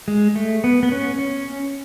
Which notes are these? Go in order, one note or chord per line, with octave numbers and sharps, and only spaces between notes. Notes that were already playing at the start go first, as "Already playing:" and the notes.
G#3
A3
B3
B3
C#4
C#4